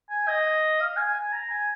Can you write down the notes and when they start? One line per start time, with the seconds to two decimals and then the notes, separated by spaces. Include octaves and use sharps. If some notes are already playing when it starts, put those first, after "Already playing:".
0.10 G#5
0.28 D#5
0.81 F5
0.97 G#5
1.14 G#5
1.32 A#5
1.50 G#5